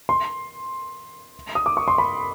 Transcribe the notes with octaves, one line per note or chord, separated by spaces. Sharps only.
C6
D#6
D6
C#6
C6
B5